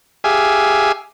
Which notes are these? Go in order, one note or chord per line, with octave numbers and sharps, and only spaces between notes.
G4 G#4 E5 F5 G#5